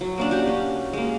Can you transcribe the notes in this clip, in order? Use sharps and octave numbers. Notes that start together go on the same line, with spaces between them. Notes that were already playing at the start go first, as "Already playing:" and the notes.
F#3
A#3 C#4 D4
F#4 G4
C#4
G#3 A#3